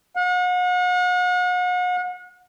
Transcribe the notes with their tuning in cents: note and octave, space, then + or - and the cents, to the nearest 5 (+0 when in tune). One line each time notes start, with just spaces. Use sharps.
F#5 -40